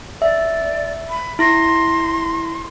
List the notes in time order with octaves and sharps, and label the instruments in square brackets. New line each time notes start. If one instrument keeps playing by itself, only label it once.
[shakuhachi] D5 [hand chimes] E5
[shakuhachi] B5
[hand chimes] E4 A#6 [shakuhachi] C6